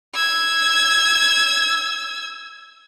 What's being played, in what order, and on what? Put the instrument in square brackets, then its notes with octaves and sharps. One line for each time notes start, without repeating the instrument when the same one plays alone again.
[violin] E6 G#6